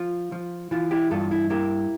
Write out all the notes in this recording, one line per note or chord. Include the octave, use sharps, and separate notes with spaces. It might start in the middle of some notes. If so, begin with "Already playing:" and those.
Already playing: F3 F4
F3
E3 F4
E4 G4
G2 F4 A4
E4
A#3 E4 G4